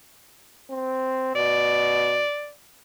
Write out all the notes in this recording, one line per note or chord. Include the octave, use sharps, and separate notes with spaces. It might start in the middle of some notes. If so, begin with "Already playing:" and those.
C4
B2 D5